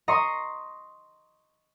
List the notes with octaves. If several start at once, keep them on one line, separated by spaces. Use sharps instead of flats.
D#5 A#5 C6 C#6 D#6